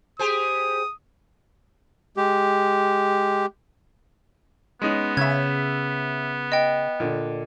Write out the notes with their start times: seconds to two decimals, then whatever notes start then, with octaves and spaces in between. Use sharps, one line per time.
0.19 G4 G#4 C5 D#6
2.17 G#3 G4
4.82 G#3 B3 C#4 D#4
5.17 C#3 C#4 E5 G#6
6.52 D#5 G5
7.00 A#2 D3